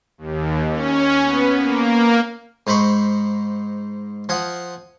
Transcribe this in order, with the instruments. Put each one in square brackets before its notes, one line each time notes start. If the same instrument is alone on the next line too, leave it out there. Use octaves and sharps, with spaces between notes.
[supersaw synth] D#2
C#4
B3
A#3
[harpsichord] G#2 D#4 C5 B5 C#6
F3 F#5 G#5 D#6